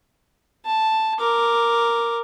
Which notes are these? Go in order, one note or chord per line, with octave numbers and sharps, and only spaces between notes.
A5
A#4 D6